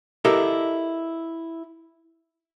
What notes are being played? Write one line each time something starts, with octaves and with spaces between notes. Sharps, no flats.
E4 G4 A4 A#4 D#5 E5